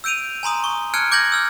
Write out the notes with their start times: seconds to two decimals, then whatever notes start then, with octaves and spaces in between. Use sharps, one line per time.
0.04 E6 G6 D7 D#7 F7
0.43 G#5 A#5 C6 D#6
0.64 C#6
0.94 A5 F6 F#6 G#6 C#7 D7
1.12 D6 G6 G#6 A#6 F#7
1.32 E6 F6 G#6